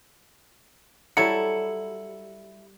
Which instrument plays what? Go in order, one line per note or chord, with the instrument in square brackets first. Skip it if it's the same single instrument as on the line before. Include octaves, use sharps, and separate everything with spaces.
[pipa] F#3 E4 [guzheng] G3 A4 [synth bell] C#7